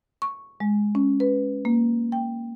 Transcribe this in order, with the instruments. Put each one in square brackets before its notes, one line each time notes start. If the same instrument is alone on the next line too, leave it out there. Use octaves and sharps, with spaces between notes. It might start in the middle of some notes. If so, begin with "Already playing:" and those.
[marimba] C#6
G#3
C#4
B4
A#3
G5